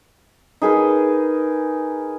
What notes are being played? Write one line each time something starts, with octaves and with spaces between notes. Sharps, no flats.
D#4 G#4 A#4 B4